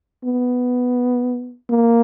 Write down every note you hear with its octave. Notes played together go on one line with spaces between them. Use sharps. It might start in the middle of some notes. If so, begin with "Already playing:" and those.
B3
A#3